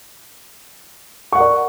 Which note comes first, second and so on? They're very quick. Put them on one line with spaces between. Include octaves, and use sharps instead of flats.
C#6 F#5 A#4 D5